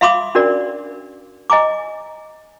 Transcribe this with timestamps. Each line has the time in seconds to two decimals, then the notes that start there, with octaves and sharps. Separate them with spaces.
0.01 E5 F5 B5 C6 D6 D#6
0.35 C#4 D4 F#4 A#4 D5
1.50 D#5 G#5 A#5 D6